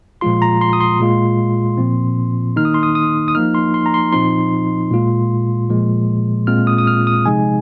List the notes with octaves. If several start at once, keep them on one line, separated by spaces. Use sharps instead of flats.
A#2 F3 G#3 F4 C6
A#5
C6
D#6
C6
A#2 G#3 F4
A#2 F3 C4
D#3 A#3 D#4 F6
D#6
C6
D#6
D#6
D#6
F3 A#3 D#4 F6
C6
C6
A#5
C6
A#2 F3 C4 D#4 C6
A#2 G#3 F4
A#2 F3 G#3
A#2 G#3 C4 F4 F6
D#6
D#6
F6
D#6
C3 F3 G#3 D#4 G#5